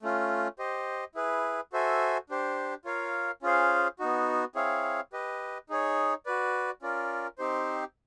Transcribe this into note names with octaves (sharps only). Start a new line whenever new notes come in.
A3 C#4 F4
G4 C5 D#5
E4 G#4 B4
F#4 A4 C5 E5 G#5
D4 G4 C5
F4 A#4 C#5 F5
C#4 F4 G#4 C5 F5
B3 D#4 F#4
C4 E4 G#4 C#5 F5
G4 B4 D#5
D#4 G#4 C#5
F#4 B4 D5
C#4 F4 A#4 D5
C4 D#4 G4 C5